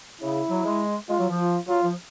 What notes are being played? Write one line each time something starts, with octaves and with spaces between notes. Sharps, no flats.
C#3 E4
F#3
G#3
G#3 F4
F#3
F3
F4
F#3 F4
F3